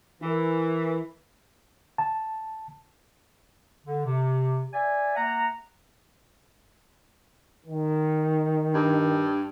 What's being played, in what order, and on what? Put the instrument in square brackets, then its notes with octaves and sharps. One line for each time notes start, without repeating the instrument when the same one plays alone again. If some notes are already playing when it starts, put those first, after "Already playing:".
[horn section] E3 [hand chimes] E4 A#4
[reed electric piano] A5
[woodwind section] D3
C3
D5 E5 G#5
A#3 E5 F#5 A#5
[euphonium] D#3
[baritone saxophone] G2